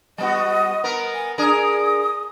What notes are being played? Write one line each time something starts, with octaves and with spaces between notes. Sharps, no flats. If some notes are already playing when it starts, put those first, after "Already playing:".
G3 B3 F#4 D#5
B3 A#4
G#5
D4 G#4 A#4 D#6